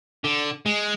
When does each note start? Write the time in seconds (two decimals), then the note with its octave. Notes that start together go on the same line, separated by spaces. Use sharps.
0.24 D3
0.66 G#3